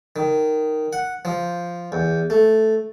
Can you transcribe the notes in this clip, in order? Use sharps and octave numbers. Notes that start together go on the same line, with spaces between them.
D#3
F#5
F3
E2
A3